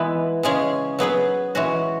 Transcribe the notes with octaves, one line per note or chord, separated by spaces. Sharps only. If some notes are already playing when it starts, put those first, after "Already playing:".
Already playing: E3 G#3 B3 E4 B4
C#3 G#3 C#4 G#4
F#3 B3 G#4 B4
E3 G#3 C#4 F#4